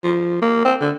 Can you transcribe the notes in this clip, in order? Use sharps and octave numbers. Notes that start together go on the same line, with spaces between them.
F3
A#3
C4
D3